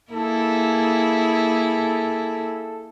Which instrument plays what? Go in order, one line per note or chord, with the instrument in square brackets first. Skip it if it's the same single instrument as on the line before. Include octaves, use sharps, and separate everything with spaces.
[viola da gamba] A#3 E4 G#4 [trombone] A4